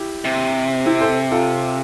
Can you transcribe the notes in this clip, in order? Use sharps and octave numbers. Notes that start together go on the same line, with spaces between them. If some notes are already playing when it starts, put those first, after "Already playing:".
Already playing: E4 G4
C3
C4 E4
A4 C5
F4 A4